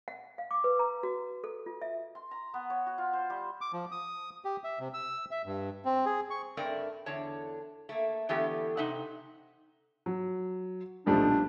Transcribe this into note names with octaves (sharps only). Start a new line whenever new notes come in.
F#5
F5
D6
B4
A#5
F#4
A4
F4
E5
C6
A#5
B3
C#5
F#4
F4
C5
G3
D6
F3
D#6
G4
E5
C3
E6
E5
G2
C4
G#4
C#6
G2 A3 C4 A#4 D5
E2 D3 C#5 A5
A3 A#3
D3 E3 A3 B3 G4 A4
C3 D#4 E5 F#5
F#3
D#1 B1 F3 G3 A3 D4